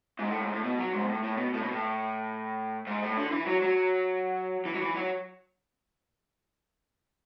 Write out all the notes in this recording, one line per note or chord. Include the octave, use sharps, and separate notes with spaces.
G#2
A2
G#2
A2
B2
F#3
G#2
B2
A2
A2
B2
A2
B2
A2
G#2
A2
D3
E3
F#3
F#3
E3
F#3
E3
F#3